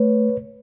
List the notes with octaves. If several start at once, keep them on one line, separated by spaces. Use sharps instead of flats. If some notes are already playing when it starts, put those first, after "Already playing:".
Already playing: A3 B4 C#5